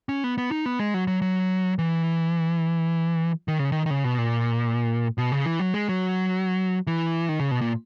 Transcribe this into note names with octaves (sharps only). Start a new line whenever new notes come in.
C#4
B3
B3
D#4
B3
G#3
F#3
F#3
F#3
E3
D#3
C#3
D#3
D#3
C#3
B2
A#2
B2
C#3
E3
F#3
G#3
F#3
E3
D#3
C#3
B2
A#2